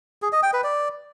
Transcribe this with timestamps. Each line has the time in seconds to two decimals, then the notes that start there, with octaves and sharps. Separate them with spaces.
0.22 G#4
0.33 D#5
0.43 G5
0.53 B4
0.64 D5